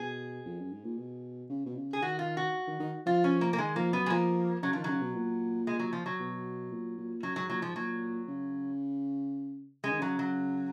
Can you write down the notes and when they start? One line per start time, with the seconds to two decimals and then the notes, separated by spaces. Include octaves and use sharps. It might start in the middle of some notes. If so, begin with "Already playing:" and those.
Already playing: B2 G#4
0.46 F2
0.59 F#2
0.72 G#2
0.84 A#2
0.97 B2
1.49 C#3
1.66 B2
1.76 C#3
1.93 G#4
2.01 D#3 F#4
2.19 F4
2.37 F#4
2.67 D#3
2.80 D#3
3.06 F3 F4
3.24 C#4
3.41 A#3
3.53 A#3
3.58 D#3 G#3
3.75 F3 A#3
3.93 F#3 B3
4.06 G#3
4.10 F3 A#3
4.62 C#3 F#3
4.73 D#3 F3
4.84 D#3 F#3
4.89 C#3
5.01 B2
5.14 A#2
5.67 G#3
5.79 F#3
5.93 F3
6.06 F#3
6.20 B2
6.71 A#2
6.98 A#2
7.23 F#2 F#3
7.36 G#2 F#3
7.49 A#2 F#3
7.62 G#2 F3
7.75 A#2 F#3
8.28 C#3
9.84 C#3 G#3
9.91 D#3
9.99 C#3 F#3
10.19 F#3